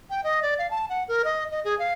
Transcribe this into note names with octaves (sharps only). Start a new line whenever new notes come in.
G5
D#5
D5
F5
A5
F#5
A#4
D#5
D#5
G#4
F5